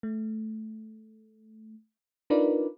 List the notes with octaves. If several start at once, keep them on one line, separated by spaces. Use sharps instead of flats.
A3
D4 D#4 F4 A#4 B4 D5